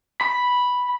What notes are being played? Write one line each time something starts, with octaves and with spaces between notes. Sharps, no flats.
B5